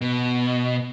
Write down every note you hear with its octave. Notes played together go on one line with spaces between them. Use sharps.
B2